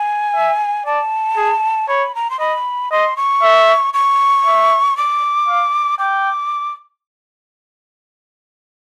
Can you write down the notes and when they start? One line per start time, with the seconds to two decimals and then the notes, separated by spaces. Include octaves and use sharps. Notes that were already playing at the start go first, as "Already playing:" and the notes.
Already playing: G#5
0.35 E5
0.86 D5 A5
1.37 G#4
1.89 C#5 B5
2.15 A#5
2.30 C6
2.39 D#5 B5
2.91 D#5 C6
3.17 C#6
3.42 E5
3.94 C#6
4.46 E5
4.97 D6
5.48 F5
5.99 G5 D6